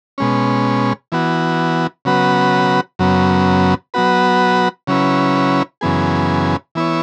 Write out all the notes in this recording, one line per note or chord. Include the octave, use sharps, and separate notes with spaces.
B2 G#3 C#4
E3 B3 F#4
C#3 F#3 B3 F#4 B4
F#2 C#3 F#3 B3
F#3 B3 F#4 B4
C#3 F#3 C#4 E4 B4
F#2 C#3 E3 B3 G#4
E3 B3 E4 C#5